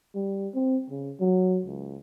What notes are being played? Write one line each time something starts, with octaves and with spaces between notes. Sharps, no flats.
G3
C4
C#3
F#3
C#2